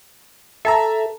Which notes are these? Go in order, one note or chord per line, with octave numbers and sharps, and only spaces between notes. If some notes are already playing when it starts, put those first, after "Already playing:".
A4 E5 A5 A#5